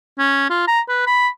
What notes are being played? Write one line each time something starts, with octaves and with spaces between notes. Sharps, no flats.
C#4
F4
A#5
B4
B5